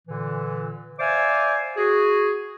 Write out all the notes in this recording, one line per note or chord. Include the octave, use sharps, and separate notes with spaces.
A#2 D3 E3
C5 D5 E5 F5 G#5 D6
F#4 G#4